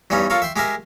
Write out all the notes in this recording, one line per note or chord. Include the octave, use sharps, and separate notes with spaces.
E2 G2 G3 C#4 D#4
F4 A4 A#4 C#5
E5 G5 C6
G#3 G4 G#4 A#4 E5